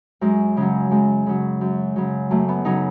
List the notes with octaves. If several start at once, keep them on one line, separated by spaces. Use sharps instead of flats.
F#2 G#3
C#3 F#3
F#2 G#3
C#3 F#3
F#2
C#3 F#3
F#2 A3
B3
C#3 F#3 D#4